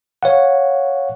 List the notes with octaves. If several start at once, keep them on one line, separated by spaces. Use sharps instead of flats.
C#5 F5 F#5